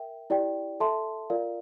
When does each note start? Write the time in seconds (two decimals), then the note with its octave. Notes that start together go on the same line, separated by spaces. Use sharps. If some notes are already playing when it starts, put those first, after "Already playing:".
Already playing: A#4 E5 G5
0.30 E4 G4 D5 G5
0.80 A4 E5 A5 C6
1.30 F4 A#4 D5 F5